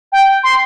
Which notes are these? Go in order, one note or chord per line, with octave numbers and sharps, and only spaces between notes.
G5
C6